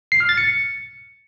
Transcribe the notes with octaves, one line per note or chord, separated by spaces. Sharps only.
C7
F6
A6
C#7